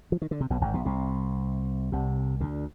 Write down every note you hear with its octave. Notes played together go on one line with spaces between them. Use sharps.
F3
D#3
D3
C3
B1 B2
G#1 G#2
B1 B2
C2 C3
C2 C3
D2 D3